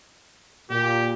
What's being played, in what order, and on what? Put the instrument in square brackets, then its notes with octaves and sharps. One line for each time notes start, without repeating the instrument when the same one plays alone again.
[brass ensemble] A#2 [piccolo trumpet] G4